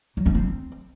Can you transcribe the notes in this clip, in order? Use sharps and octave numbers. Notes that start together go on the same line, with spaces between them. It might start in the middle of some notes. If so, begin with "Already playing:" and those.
F#3
C#4
C4